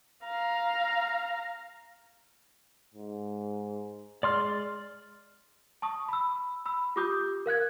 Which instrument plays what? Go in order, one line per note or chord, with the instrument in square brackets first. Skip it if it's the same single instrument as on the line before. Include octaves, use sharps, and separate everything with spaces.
[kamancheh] F5 A#5
[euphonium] G#2
[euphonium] G#3 [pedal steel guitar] D5 C6 F6
[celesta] A5 C#6 D#6
B5 E6
B5 E6
F4 G4 D6 D#6 G6
A#4 F5 F#6 G#6